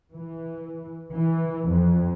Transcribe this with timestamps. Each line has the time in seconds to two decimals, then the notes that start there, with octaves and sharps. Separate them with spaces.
0.13 E3
1.15 E3
1.69 F2